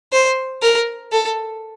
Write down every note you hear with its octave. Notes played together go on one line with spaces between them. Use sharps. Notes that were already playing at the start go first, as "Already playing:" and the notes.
C5
A#4
A4